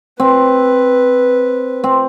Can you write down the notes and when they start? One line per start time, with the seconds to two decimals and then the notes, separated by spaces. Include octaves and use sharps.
0.19 C4 B4
1.84 C4